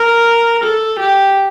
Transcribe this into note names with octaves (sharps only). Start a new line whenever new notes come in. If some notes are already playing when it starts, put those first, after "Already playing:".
Already playing: A#4
A4
G4